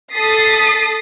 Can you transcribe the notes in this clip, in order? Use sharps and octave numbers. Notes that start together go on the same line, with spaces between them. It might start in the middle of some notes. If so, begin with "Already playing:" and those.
A4 D#6 A6 B6 C7